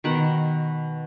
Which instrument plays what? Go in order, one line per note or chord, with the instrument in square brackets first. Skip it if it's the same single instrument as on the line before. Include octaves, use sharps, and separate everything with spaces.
[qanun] B2 D#3 F#5